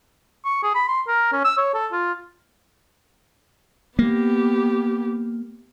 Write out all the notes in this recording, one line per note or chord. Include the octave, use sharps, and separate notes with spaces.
C#6
G#4
B5
C6
A#4
C#4
E6
C#5
A4
F4
A#3 B3 G4